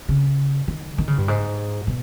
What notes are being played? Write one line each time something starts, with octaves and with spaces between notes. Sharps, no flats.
C#3
D#3
D#3
C#3
G2
G#2
B2